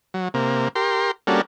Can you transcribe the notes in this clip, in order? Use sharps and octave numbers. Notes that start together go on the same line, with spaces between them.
F#3
C3 A#3
G4 A#4 C6
G3 A#3 C#4 D4 F#4 A4